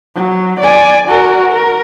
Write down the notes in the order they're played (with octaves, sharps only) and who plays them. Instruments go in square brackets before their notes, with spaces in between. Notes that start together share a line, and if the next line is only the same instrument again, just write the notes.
[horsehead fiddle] F#3
D5 G#5
F#4 A#4
A#4